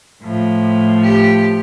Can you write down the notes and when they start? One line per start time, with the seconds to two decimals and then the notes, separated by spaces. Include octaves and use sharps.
0.22 A2 F3
1.03 G4